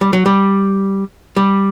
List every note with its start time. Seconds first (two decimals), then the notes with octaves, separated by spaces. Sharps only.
0.01 G3
0.13 F#3
0.26 G3
1.36 G3